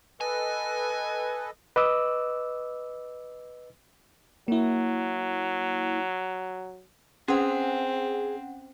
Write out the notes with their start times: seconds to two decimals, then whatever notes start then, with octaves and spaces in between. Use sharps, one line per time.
0.21 A4 B4 D#5 G#5
1.76 B4 D#5 D6 E6
4.48 F#3 A#3 E4
7.28 C4 C#4 G#4 F#5